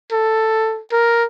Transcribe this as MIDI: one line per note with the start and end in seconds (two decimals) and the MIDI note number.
0.11 0.81 69
0.92 1.24 70